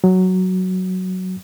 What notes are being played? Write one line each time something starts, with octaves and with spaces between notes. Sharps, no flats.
F#3